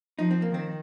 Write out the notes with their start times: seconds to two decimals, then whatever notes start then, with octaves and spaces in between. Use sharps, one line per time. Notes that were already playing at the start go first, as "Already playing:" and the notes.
0.19 F3 D#4
0.31 C4
0.42 A#3
0.51 D#3 C4